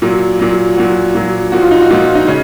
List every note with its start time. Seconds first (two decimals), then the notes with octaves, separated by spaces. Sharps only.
0.02 A#2 F#3
0.39 A#2 F#3
0.77 A#2 F#3 F#4
1.15 A#2 F#3
1.52 A#2 F3 F#4
1.62 F4
1.71 D#4
1.80 F#4
1.90 A#2 F3 F4
2.15 D#4
2.27 C#3 C#4